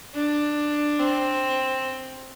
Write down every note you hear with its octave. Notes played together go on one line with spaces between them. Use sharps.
D4
C4